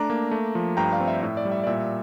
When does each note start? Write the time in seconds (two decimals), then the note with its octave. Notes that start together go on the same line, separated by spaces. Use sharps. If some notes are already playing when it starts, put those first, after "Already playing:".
Already playing: A3 D4 A#5 D6
0.10 A#3
0.31 A3
0.55 F3
0.77 G2 G5 A#5
0.92 D5 F5
1.00 C4
1.08 E5
1.21 A2 E5
1.37 D5
1.45 G3
1.51 E5
1.64 D5
1.67 A#2 E5